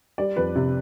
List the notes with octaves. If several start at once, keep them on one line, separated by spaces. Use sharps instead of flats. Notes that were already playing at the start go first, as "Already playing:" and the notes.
G3 D5
F2 B4
C3